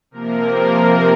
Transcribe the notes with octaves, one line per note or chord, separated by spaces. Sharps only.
C3 F3 A#3 A#4